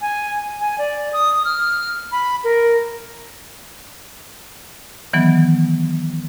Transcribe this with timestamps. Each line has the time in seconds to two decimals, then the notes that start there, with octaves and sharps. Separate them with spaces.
0.01 G#5
0.60 G#5
0.78 D5
1.13 D#6
1.45 F6
2.12 B5
2.44 A#4
5.13 D#3 E3 F#3 B3